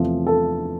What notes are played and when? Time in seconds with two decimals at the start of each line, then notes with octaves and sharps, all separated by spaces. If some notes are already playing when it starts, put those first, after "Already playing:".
Already playing: E2 C3 F3 A3
0.27 A4